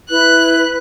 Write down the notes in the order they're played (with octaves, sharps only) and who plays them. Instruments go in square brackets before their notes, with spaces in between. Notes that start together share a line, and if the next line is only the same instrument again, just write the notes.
[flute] E4 [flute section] B4 [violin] F#6